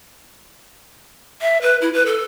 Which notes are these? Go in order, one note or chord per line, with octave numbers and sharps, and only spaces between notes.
E5
B4
E4
B4
A4